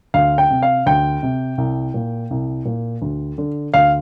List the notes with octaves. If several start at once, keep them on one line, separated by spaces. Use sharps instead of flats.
D2 F5
G5
C3
F5
D2 G5
C3
C2
A#2
C2
A#2
D2
D3
D2 F5